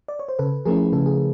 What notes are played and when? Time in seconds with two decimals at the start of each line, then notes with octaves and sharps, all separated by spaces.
0.08 D5
0.19 C#5
0.29 C5
0.39 C#3 A4 B4
0.65 F3 A3 C#4 E4 G#4 A#4
0.92 C#3 A4
1.06 G#4